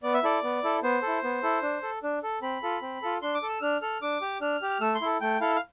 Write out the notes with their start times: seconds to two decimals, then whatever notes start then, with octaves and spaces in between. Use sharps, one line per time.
0.03 B3 D5
0.14 E5
0.23 E4 A4 D5
0.43 B3
0.64 E4 A4
0.83 B3 C5
1.02 E4 A4
1.23 B3
1.43 E4 A4
1.62 D4
1.83 A4
2.03 D4
2.23 A4
2.42 C4 B5
2.63 F4 A4
2.82 C4
3.02 F4 A4
3.22 D4 C6
3.35 D6
3.42 A4
3.49 E6
3.62 D4 F6
3.82 A4 F6
4.02 D4 D6
4.21 G4
4.41 D4 F6
4.62 G4
4.70 F6
4.81 A3 E6
4.95 C6
5.01 E4 A4
5.21 A3 G5
5.41 E4 A4 F5
5.56 F5